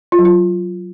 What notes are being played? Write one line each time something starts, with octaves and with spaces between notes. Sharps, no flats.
F4
F#3
F4